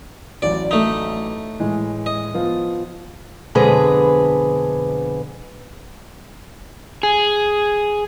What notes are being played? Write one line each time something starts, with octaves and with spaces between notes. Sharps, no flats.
A1 F#3 D5
A3 D#4
A2 E3 G#3
D#5
F3 B3 F4
F2 B2 D3 G#3 G#4 B4
G#4